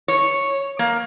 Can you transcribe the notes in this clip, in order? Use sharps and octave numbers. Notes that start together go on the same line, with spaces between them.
C#5
A#3